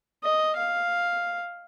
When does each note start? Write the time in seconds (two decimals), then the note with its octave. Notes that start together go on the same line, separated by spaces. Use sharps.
0.23 D#5
0.57 F5